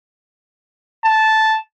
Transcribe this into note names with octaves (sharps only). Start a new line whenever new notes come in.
A5